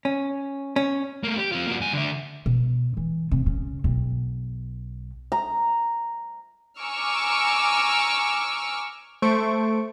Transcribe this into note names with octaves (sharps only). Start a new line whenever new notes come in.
C#4
C#4
A3 A#3
G4
C4 F4
A#3 F#4
G2 G#5
D3 E5
B2
E3
C3
C#3
B1
A#5
G#5 A#5 C#6 D6 E6 F6
A3 C5 C#6 D7